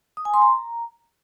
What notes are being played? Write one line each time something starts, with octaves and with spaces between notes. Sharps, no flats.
D#6
G#5
C6
A#5